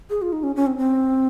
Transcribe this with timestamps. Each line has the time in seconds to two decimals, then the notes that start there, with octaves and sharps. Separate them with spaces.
0.10 G#4
0.22 F4
0.32 D#4
0.43 C#4
0.56 C#4
0.67 C4
0.77 C4